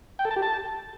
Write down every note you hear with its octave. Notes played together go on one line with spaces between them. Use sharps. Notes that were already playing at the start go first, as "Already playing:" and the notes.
G5
A4
A5
G4
A5